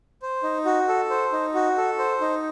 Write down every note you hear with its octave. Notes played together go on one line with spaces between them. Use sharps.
C5
D#4
F#4
A4
C5
D#4
F#4
A4
C5
D#4